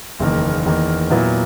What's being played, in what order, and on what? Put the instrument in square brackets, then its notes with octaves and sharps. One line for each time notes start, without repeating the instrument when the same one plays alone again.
[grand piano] F#1 E2 D#3 A#3
E2 D#3 A#3
A#2 F#3 B3 E4